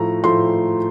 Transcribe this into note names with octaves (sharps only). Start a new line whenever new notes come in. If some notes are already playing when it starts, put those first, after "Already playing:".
Already playing: A2 F3 A3 A#5
A2 F3 A3 C6